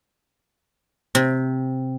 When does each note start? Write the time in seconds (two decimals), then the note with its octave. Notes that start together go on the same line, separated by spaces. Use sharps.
1.15 C3